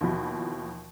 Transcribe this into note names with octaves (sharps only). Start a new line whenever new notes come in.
D#2 B2 E3 F3 F#4 B5